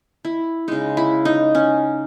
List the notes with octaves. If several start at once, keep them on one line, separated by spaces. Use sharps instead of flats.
E4
C#3 G#3 D#4
E4
D#4
C#4